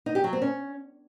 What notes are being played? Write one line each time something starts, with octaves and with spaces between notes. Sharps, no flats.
D#4
G4
F#3
C4
C#4